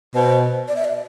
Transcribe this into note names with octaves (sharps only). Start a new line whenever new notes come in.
B2 C5
D5
E5
D5